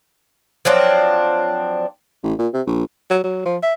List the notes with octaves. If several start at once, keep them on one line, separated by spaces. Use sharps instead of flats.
F3 F#3 C4 D4
A1
A#2
C3
A#1
F#3
F#3
F3
E5